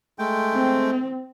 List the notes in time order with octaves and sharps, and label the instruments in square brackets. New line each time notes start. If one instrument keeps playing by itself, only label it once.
[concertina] G#3 A3 G5
[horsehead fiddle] C4